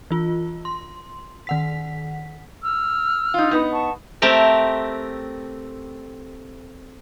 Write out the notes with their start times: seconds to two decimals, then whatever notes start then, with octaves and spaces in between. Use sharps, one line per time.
0.11 E3 F4
0.65 C6
1.47 D#3 F#5 B6
2.63 E6 F6
3.34 D#4 F4
3.51 B3 D#4
3.73 F#5 A5 C#6
4.22 A3 C4 G4 A#4